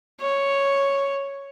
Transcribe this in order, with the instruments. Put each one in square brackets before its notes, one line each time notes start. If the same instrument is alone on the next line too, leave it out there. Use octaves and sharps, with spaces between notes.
[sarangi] C#5